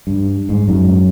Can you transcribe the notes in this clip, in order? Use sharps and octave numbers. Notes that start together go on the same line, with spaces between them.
G2
G#2
F#2